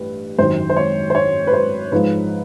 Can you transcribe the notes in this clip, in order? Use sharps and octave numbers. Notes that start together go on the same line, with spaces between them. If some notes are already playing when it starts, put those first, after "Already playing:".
Already playing: A1 G2 B4
G#1 F#2 D#3 C5
C5
C#5
C5
C#5
B4
C5
G#2 F3 G#3 B4